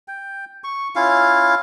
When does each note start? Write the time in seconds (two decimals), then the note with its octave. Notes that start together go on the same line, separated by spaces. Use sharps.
0.08 G5
0.64 C#6
0.96 C#4 E4 F4 F5